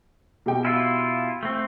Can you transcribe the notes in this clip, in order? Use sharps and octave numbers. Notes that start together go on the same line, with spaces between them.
B2 G4 G5
E4 F4
A3 C4